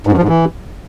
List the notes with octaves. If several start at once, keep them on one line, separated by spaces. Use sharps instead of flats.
G#2
F#2
F3
G#2
E3